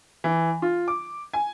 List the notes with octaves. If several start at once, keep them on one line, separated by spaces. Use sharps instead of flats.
E3
F4
D6
G#5